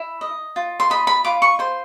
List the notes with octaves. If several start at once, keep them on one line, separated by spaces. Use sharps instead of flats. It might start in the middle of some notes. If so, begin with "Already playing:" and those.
Already playing: E4
D#5
F4
C6
D#5 B5
B5
F4 D6
C#6
C5 C6